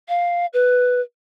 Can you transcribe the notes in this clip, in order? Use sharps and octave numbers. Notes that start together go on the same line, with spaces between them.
F5
B4